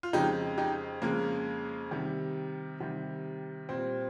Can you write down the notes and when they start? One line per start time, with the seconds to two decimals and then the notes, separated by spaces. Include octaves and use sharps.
0.03 F4
0.13 F2 C#3 G#3 D#4 G4
0.58 D#4 G4
1.02 F2 C#3 G#3 A#3
1.91 C3 D#3 G3
2.80 C3 D#3 G3
3.69 A#2 G3 C4